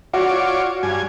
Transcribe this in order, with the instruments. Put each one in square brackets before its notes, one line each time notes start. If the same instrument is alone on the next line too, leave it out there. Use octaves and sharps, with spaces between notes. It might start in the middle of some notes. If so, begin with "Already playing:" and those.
[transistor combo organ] F4 C#5 D5 [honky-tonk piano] F#4
[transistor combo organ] G2 G#5